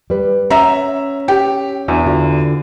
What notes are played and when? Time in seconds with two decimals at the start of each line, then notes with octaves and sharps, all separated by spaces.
0.10 G3 B4
0.50 C#4 E5 F#5 A#5
1.28 G4
1.88 E2 D4 F#4
2.06 D3 F4 F#4